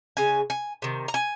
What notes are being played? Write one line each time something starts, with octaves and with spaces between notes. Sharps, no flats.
C#3 G#3 G#5
G#5
C3 D#3
A#5
G#5